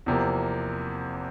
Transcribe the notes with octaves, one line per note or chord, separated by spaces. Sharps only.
E2 C3 F3 A#3